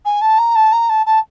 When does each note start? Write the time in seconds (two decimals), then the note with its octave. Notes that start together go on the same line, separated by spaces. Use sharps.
0.05 G#5
0.21 A5
0.38 A#5
0.56 A5
0.72 A#5
0.89 A5
1.06 A5